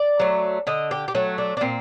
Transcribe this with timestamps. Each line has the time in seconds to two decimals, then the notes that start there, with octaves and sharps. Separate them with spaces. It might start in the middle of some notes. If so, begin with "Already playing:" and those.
Already playing: D5
0.20 F#3 A3
0.67 D3 D#5
0.91 G4
1.08 G4
1.15 F#3 A3 F#4
1.38 D4
1.57 D4
1.61 A#2 C4